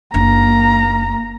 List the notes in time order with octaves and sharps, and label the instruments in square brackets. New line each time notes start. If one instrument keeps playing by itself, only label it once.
[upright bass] F#1 D4 [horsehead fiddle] A#3 A#5